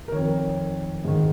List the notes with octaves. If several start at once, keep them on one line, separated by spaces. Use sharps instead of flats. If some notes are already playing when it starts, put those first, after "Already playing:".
A#4
F2 D#3 C#5
G#2 D#3